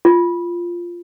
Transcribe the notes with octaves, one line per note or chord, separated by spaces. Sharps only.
F4